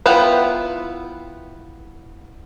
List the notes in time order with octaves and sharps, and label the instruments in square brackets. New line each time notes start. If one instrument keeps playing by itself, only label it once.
[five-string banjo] B3 E4 F4 B4 G5